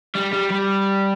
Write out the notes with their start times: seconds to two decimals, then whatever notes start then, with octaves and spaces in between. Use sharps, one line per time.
0.15 G3
0.33 G3
0.51 G3